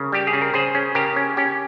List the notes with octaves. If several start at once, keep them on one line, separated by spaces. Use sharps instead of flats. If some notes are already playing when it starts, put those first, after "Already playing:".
Already playing: C#3 A#4 C#5
G3 G4
G#4
C#3
A#4
C#3 G#4 C5
C#4
C#3 G4 A#4
C#4
C#4 G4